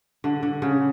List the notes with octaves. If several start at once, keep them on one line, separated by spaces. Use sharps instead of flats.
D3
D3
C#3